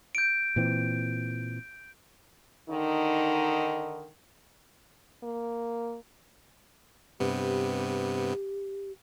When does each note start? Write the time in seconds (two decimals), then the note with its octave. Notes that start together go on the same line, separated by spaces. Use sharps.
0.15 G6 D7
0.56 A#2 E3 C4
2.70 D3 D#3 D#4
5.23 A#3
7.20 G2 C3 B3 G4